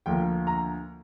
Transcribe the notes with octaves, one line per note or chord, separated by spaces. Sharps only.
D2 D3 F3 A#3 G5
A#5